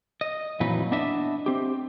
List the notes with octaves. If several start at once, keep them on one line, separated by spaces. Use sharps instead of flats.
D#5
F2 A#2 E3 F#3 D#4 B4
B3 D4 D#5 E5
C4 G4